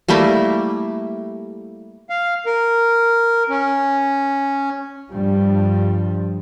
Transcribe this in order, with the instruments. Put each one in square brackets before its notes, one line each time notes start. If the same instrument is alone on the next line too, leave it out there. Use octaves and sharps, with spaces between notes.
[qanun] G3 A3 A#3 E4
[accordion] F5
A#4
C#4
[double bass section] G2 F3 G3